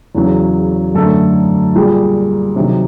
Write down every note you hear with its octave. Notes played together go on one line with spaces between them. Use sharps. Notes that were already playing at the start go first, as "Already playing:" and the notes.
E2 C#3 F#3
F#2 D3 F#3 A3 A4
A#2 G3 G#4
C3 D#3 F#3